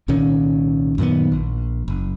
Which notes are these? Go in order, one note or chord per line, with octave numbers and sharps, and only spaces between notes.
C2 A#2 D#3 C#4
F#2 A#2 D#3 B3
A#1
F#1